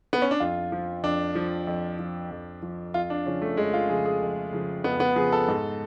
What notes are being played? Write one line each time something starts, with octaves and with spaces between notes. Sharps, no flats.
B3
C#4
D4
F2 F4
F3
F2 D4
F3
F2
F3
F2
F3
F2 F4
D4
C#3 F3 C#4
A3
F2 G#3
F4
C#3 F3 G#4
G#4
F2
C#3 F3
F2 B3
B3
C#3 F3 G#4
A4
G#2